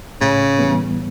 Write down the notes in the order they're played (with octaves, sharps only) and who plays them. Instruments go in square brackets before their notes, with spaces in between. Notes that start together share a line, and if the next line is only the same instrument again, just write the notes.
[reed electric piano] A2 [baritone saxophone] C#3
[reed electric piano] E3 G3 B3